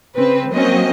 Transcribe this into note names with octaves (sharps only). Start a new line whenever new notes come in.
C#3 C4 B4
F#3 A#3 C4 C#4 D#5